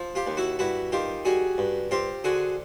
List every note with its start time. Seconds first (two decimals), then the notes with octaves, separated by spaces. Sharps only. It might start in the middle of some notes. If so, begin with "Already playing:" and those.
Already playing: F3
0.15 F4 G4
0.26 D#2
0.37 E4 F#4
0.59 G2 E4 F#4
0.92 D#3 F4 G4
1.25 G3 F#4 G#4
1.58 G2
1.91 C4 F4 G4
2.24 D3 F#4 G#4